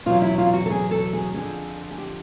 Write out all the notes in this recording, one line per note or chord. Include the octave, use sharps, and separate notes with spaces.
E2 B2 F#3 F4
E4
F4
F#4
A4
G#4
A4
G#4
F2 D3 F3 G#4
G#4
G4